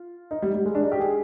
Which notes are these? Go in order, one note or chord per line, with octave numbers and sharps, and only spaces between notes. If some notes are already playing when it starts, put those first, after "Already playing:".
Already playing: F4
D#4
G3
G3
G#3
D4
D#4
G4
G#4